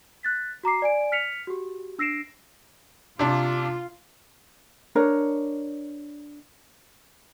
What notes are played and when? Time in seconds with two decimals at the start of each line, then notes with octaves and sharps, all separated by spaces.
0.23 F#6 A6 B6
0.63 F#4 A#5 D6 C7
0.82 D5 G#5 D7
1.12 F6 B6 C#7 F7
1.47 F#4 G4
1.98 D4 E6 A#6 C7 D7 E7
3.19 C3 D4 F4
4.95 D4 A#4 C#5